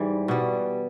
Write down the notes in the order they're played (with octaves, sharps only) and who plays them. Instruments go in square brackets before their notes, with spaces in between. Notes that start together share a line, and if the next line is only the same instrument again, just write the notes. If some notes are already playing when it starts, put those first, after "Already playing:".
Already playing: [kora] G#2 E3 G3
B2 G3